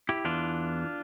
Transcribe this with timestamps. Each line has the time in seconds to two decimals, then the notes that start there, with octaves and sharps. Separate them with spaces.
0.09 E4 G4
0.25 E2 E3 D4 F4